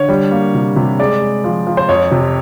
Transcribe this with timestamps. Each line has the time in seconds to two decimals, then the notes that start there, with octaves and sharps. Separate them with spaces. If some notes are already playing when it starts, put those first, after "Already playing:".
Already playing: D3 C#5
0.09 G3
0.31 A#3
0.54 C3
0.76 C3
0.99 G#3 D5
1.22 G#3
1.44 F3
1.67 F3
1.77 C5
1.89 F2 C#5
2.11 C3